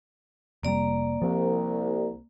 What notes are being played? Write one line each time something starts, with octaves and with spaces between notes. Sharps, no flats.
F1 C3 G3 A#3 D5 A#5
C2 F3 C4